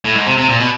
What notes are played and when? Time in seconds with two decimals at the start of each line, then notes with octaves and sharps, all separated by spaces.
0.05 A2
0.15 G#2
0.27 C3
0.38 C3
0.49 A#2
0.60 B2